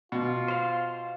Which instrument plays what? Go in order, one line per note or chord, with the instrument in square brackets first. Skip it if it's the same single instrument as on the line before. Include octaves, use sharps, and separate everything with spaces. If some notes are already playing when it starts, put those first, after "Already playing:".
[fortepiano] B2 [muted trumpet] F4
[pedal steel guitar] C5 F5